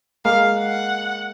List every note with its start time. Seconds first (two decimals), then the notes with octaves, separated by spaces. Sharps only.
0.25 G#3 A#3 F5
0.60 F#5